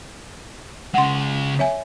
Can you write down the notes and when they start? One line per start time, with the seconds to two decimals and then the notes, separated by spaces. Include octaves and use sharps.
0.94 C#3 G#3 F#5 C6
1.59 C#5 E5 G#5